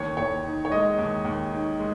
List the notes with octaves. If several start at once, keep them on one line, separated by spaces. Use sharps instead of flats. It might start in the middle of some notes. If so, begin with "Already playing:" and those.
Already playing: D#2 C#5
D#2 C#5
D#3
C#5
G#3 D#5
D#2
D#2
D#3
G#3